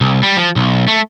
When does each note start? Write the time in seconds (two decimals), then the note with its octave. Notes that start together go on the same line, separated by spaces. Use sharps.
0.01 C2
0.23 G3
0.37 F3
0.56 B1
0.88 A3